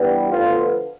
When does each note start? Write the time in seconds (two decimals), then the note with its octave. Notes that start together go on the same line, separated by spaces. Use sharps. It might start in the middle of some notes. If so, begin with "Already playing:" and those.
Already playing: G2 E3 G3 B3
0.32 D2 D3 F3 B3 F4